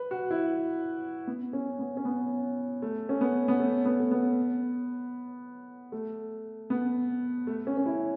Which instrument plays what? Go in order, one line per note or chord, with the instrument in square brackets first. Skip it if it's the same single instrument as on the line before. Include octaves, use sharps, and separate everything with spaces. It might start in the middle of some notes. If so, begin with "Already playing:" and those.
Already playing: [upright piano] B4
F#4
E4
B3
C#4
B3
C#4
B3
A3
C#4
B3
B3
A3
B3
A3
B3
A3
B3
A3
C#4
C#4
E4